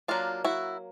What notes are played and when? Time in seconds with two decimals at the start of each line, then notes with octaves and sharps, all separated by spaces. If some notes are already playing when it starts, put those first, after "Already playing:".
0.08 F#3 A#3 D4 F4
0.44 E4 F#4